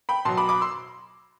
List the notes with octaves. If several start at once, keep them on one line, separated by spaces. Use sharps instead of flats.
G5 B5
B2 F#3 A5 C6
B5 D6
B5 D6
C6 E6